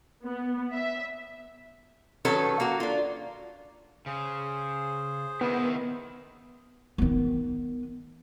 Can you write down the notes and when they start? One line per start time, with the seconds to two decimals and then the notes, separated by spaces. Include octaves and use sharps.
0.24 B3
0.73 E5
2.25 D#3 F#3 C#4 A4 B4
2.60 A#3 F#4
2.80 D4 F4
4.06 C#3 G#4 C5
5.41 D#3 B3 E4
6.98 D#3 B3